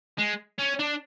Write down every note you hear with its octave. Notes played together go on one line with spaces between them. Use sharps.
G#3
C#4
D4